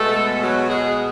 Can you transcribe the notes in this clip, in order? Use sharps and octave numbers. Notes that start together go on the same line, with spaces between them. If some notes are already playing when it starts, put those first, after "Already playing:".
Already playing: B2 G#3 A3 B3 A4
F#3 F#4
G#3 G#4